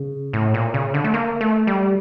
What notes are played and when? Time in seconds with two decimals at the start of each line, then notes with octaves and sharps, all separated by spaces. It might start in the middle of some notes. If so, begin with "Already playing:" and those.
Already playing: C#3
0.33 A2
0.54 A#2
0.74 C#3
0.94 D3
1.04 A3
1.14 A#3
1.41 A3
1.67 G3